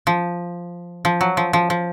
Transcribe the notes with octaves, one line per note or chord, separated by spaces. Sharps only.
F3
F3
F#3
F3
F3
F3